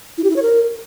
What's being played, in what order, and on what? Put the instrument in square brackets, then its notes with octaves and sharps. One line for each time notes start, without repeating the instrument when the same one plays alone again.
[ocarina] E4
G4
E4
C#5
A#4